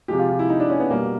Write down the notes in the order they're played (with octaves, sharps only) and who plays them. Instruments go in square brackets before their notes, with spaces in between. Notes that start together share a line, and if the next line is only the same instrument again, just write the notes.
[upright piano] C3 F3 G#3 G4
F4
F4
E4
D#4
D4
C#4
B3
B2 G3 A#3